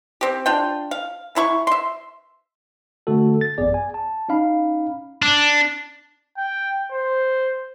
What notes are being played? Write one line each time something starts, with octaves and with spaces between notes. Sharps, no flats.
C4 G4
D4 F4 G5
F5
E3 E4 B5 C#6
E5 C6
D3 A3 F#4 A4
A6
A1 F#2 B3 G#4 D5
G#5
A5
C#4 D#4 F5 B5
D4
G5
C5